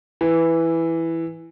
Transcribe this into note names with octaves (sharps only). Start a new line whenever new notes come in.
E3